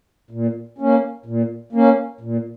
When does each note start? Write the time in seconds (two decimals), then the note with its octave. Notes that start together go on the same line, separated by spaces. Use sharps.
0.31 A#2
0.78 A#3 C#4
1.26 A#2
1.73 A#3 C#4
2.21 A#2